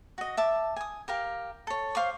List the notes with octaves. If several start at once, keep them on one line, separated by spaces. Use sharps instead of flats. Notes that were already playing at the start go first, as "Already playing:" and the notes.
F#4 D#5
E5 A5 D6
G#5 D#6
G4 A#4 F5
A4 C#5
C5 F5 C#6 D6